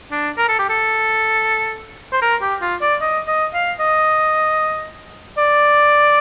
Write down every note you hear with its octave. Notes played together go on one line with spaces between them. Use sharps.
D4
A#4
A4
G4
A4
C5
A#4
G4
F4
D5
D#5
D#5
F5
D#5
D5